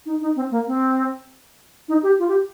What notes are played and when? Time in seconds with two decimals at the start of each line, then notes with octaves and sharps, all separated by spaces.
0.06 D#4
0.21 D#4
0.36 C4
0.51 A#3
0.67 C4
1.88 D#4
2.03 G4
2.19 F4
2.28 G4